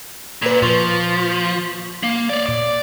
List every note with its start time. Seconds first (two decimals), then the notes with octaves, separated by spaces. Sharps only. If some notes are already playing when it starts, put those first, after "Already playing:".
0.42 A#2 B4 B6
0.62 A#2 F3 C6 C#6
2.03 A#3
2.29 C#5 D5
2.46 A#2 D5 D6